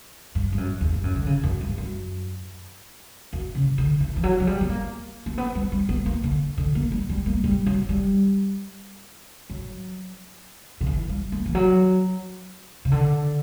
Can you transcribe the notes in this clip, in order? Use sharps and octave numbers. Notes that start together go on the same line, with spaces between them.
G2
G2
F#2
E2
G2
F#2
D3
C#3
F#2
G2
F#2
F#2
C#3
D3
E3
E3
F#3
F#3
G3
B3
A#3
A#3
B3
G3
G3
B3
A#3
D3
D3
A#3
G3
G3
A#3
G3
F#3
G3
F#3
D3
E3
G3
A#3
E3
F#3
C#3
D3